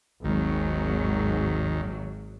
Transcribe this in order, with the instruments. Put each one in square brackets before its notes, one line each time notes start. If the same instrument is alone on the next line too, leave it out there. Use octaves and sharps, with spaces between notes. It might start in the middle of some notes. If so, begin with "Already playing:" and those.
[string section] G#1 G#2 F#3 [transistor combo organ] D#2